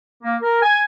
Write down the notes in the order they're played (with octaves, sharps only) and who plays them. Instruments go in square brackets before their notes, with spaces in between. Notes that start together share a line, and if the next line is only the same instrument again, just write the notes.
[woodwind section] A#3
A#4
G#5